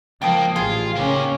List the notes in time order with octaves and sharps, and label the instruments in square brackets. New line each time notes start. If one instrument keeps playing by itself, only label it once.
[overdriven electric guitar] C#2 A#3 [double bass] F3 [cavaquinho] G5 A5 D#6
[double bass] A1 [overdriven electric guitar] F4 [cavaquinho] G#4
[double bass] C#3 C#4 [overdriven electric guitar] A#3 G4